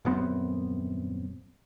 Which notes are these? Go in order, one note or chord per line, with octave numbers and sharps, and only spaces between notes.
D#1 F#2 B3 C4